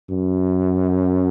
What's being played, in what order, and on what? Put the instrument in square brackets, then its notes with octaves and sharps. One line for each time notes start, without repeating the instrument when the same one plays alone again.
[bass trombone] F#2